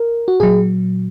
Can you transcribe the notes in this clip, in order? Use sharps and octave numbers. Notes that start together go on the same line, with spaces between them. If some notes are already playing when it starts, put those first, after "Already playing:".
Already playing: A#4
F#4
A#2 F#3 G#4